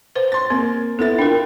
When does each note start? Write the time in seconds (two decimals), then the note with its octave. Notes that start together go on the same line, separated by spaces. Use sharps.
0.15 B4 C5
0.32 C6 A6
0.50 A#3 C4
0.99 B3 E4 A4 A6
1.19 D4 F4 A#4 G5